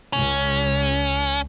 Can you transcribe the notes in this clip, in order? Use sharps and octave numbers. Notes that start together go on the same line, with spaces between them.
C#2 C#4